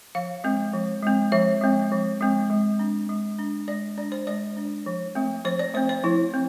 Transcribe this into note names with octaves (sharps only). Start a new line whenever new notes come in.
F3 F5
G#3 C4
F3
G#3 C4
F3 E5
G#3 C4
F3
G#3 C4
G#3
D4
G#3
D4
G#3 D5
D4 D5
C5
G#3 D5
D4
F3
A3 C4
F3 C5
D5
A3 C4 C5
C5
F3 E4
C4